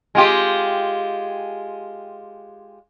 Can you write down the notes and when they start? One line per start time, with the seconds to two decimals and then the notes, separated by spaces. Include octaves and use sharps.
0.15 G#3 F4 G4